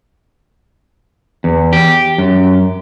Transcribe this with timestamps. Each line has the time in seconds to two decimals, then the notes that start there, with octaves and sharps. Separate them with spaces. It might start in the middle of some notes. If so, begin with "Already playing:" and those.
1.44 E2
1.73 G4
2.18 F#2